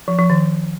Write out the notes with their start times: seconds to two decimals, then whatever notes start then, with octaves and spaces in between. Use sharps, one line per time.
0.08 F3
0.19 F3
0.30 D#3